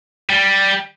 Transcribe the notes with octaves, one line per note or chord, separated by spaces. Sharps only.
G3